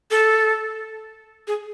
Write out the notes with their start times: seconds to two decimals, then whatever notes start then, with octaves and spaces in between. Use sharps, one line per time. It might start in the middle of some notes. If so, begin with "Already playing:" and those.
0.11 A4
1.47 G#4